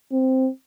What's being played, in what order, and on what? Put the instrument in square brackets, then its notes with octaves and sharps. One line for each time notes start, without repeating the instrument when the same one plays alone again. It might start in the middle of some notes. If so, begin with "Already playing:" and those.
[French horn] C4